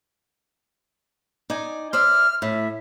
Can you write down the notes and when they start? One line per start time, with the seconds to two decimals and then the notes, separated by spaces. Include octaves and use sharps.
1.50 D#4 D5 G#5
1.93 C5 D5 E5 F6
2.42 A2 E5